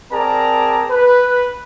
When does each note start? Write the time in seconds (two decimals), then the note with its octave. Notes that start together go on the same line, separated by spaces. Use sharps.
0.13 C4 G#4 A#4 D5 A5 A#5
0.91 B4